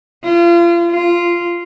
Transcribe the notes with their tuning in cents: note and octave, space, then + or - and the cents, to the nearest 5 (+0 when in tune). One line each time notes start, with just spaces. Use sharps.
F4 -35
F4 -10